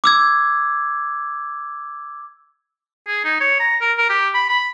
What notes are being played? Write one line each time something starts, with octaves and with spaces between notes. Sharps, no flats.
D6 E6 G#6
G#4
D#4
C#5
A#5
A#4
A#4
G4
B5
B5